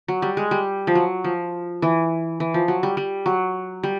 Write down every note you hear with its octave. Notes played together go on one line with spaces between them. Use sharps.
F#3
G3
G#3
G3
F3
F#3
F3
E3
E3
F3
F#3
G3
G3
F#3
G3